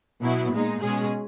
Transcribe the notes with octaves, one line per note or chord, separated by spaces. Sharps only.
B2 F#3 B3 E4
A#2 G#3 D#4
B2 G#3 C#4 G#4